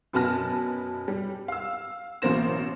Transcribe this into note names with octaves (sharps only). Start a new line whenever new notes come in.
F#2 B2 B4 A5 F6 A#6
G3
F5 E6
A1 B2 A#3 C5 A#6 E7